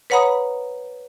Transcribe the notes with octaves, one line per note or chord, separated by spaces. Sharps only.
B4 C#5 F#5 A#5 B5 D#6